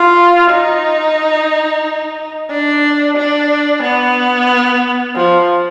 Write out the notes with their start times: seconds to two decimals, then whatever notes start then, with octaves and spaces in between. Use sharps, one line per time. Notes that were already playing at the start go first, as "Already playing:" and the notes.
Already playing: F4
0.51 D#4
2.50 D4
3.17 D4
3.83 B3
5.15 F3